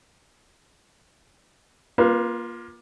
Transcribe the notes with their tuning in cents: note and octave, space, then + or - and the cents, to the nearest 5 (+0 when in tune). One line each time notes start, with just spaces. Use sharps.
A#3 +25 F4 +0 B4 +0